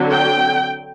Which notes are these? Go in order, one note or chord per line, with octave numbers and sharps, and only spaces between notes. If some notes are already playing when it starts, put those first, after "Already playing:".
Already playing: D3 F#3 C4
G5